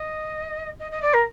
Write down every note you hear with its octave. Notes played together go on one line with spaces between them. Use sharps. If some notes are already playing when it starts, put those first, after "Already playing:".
Already playing: D#5
D#5
D#5
D5
A#4